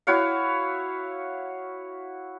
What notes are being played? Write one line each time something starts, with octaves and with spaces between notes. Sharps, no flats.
E4 F#4 C#5 F5